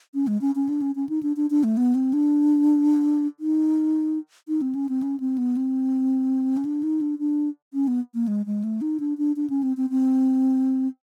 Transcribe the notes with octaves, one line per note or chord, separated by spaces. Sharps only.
C#4
G#3
C#4
C#4
D4
C#4
C#4
D#4
D4
D4
D4
A3
B3
C4
D4
D#4
D#4
C4
C#4
C4
C#4
C4
B3
C4
C#4
D4
D#4
D4
D4
C#4
B3
A#3
G#3
G#3
A3
D#4
D4
D4
D4
C#4
C4
C4
C4